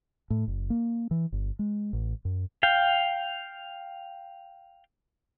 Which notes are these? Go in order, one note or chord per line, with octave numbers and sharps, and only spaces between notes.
A2
F#1
A#3
E3
G1
G#3
A1
F#2
F5 G5